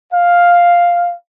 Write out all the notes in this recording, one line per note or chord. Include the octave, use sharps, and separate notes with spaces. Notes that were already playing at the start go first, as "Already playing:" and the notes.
F5